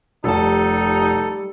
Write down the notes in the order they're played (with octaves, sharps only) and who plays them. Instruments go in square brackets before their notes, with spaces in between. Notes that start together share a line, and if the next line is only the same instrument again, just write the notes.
[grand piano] F1 A5 [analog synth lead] G3 [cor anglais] D#4 [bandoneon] A4